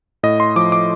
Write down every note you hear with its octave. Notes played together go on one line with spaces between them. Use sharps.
A2 D#5
C6
F3 D6
D6